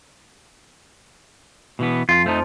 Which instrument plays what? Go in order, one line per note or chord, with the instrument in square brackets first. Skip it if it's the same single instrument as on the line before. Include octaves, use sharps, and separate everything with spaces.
[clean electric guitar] B2 E3 B3
[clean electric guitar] F2 [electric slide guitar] F4
[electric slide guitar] F2 F3 [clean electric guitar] A3 D#4